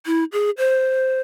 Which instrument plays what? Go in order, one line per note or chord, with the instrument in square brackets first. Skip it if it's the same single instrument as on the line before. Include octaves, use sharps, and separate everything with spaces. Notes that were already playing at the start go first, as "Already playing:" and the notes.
[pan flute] E4
G#4
C5